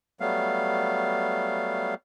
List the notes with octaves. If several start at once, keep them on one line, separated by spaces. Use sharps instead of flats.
F#3 G3 A3 B3 F5